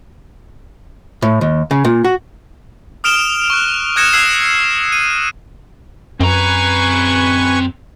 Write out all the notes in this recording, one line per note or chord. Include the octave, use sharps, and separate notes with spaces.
A2
D#2
C#3
A#2
F#4
D#6 F6 D7 E7 F7 G7
C#6 F#6
D#6 F#6 G#6 A#6 C#7 E7
E6 F#6 G#6 C7 E7
D#7
F#2 C4 B4 G#5 A#5 C#6